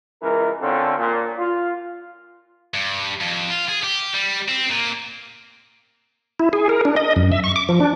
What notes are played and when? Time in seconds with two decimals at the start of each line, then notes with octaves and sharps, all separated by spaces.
0.21 C#2 E3 A#4
0.61 D3 C4 C#4 F4 A4
0.97 A#2
1.38 F4
2.74 G2
3.20 F2
3.50 F4
3.68 G#4
3.83 G4
4.15 G3
4.48 C4
4.70 A#2
6.40 E4
6.53 G#4
6.69 A#4
6.85 D4
6.96 D#5
7.16 F#2
7.32 E5
7.44 C#6
7.56 D6
7.69 F3
7.80 D4